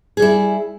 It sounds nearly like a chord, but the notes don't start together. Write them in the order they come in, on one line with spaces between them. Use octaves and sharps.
G#4 G3 E4